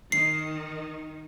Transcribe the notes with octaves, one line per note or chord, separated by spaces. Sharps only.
D#3 C7